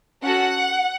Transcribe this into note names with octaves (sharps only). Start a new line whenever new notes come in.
C#4 F#4 A4 F#5